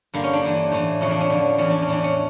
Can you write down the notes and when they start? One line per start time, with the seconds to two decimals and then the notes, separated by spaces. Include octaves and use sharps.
0.14 G2 D3 A#3
0.24 C#4
0.33 D4
0.42 G2 E3
0.72 A2 E3
1.01 F2 C#3 E3 C#4
1.11 D4
1.21 C#4
1.30 F2 D3
1.58 E2 E3 C#4
1.70 D4
1.82 C#4
1.88 A2 E3 D4
2.04 C#4